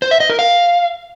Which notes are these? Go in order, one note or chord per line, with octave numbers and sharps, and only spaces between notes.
C5
E5
D#5
A#4
F5